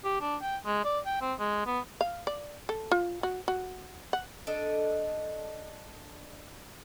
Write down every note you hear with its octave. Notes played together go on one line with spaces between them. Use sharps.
G4
D4
G5
G#3
D5
G5
C4
G#3
B3
F5
D5
A4
F4
F#4
F#4
F#5
D4 A4 D#5